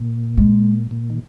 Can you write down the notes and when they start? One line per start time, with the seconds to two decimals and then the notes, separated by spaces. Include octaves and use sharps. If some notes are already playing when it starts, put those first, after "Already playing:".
Already playing: A#2
0.37 G#3
0.91 A#2
1.10 D#3